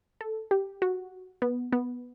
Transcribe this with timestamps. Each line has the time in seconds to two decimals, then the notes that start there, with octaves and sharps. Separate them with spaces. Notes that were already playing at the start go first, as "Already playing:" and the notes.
0.21 A4
0.51 G4
0.82 F#4
1.42 B3
1.73 B3